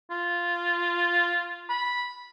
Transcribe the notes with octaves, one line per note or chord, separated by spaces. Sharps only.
F4
B5